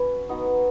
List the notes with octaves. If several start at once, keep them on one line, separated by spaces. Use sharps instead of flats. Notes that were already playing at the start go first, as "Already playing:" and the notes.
Already playing: C#4 F#4 B4
F#3 B3 D#4